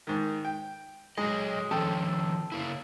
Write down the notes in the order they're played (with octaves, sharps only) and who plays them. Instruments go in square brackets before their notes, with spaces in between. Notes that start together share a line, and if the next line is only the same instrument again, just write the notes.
[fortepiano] G#2 D#3
G5
[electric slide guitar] F#3 D#5 [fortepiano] G#3
[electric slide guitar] D#3 F3 C#4 [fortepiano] A4 G5 A5
[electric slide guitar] C#3 A#3 E4